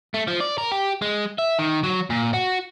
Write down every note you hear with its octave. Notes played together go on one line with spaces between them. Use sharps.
A3
F3
D5
A#4
G4
G#3
E5
D#3
F#3
A#2
F#4